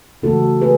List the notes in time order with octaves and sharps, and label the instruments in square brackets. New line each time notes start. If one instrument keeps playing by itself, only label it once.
[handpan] C#3 E3 A3 F#4 A4
G#4 B4